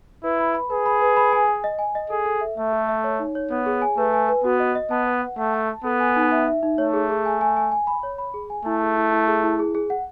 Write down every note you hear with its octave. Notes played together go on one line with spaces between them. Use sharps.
E4 B4
B5
B5
G#4 B4
B5
B4
B5
G#5
G#5
D#5
G#5
D#5
G#4 A4
A4
E5
A3 E5
A4
E5
C#5
D#4
C#5
B3 C#5
G#4
G#5
A3 B4
G#5
B4
B3 F#4
D#5
D#5
B3 A5
B4
F#5
A3 F#5
A5
A5
B3 A4
G#5
D#4
E5
E5
D#4
A3 C#5
G#4
G#4
G#5
G#5
G#5
G#5
B5
C#5
B5
G#4
G#5
A3 E4
G#4
E4
E4
G#4
E4
G#4
G#4
F#5